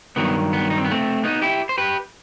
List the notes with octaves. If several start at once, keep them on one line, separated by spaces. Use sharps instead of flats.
G2 D#3 F#3 B3
B3
D#4
C4
B3
A3 C4
B3 D#4
E4 G4
C5
G4 B4